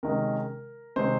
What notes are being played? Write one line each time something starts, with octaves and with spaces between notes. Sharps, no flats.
C3 D#3 G#3 C#4 A#4
C3 D#3 G#3 C#4 C5